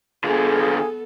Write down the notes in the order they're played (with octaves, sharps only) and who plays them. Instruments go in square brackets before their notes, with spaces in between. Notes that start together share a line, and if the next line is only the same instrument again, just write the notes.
[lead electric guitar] D3 F4 [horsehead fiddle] B3 A4 [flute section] G#4 G#5